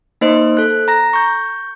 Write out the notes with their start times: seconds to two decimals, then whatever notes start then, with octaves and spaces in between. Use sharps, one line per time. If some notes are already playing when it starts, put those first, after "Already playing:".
0.21 A#3 D#4 C5 D#5
0.57 A4 F#6
0.88 A#5 A#6
1.13 C#6 G6